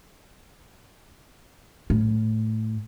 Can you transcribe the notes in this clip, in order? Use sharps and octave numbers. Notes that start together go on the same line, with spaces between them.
A2